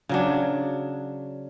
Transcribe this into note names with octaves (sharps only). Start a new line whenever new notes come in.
C#3 F#3 D4